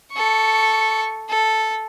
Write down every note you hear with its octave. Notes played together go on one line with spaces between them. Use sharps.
A4 C#6
A4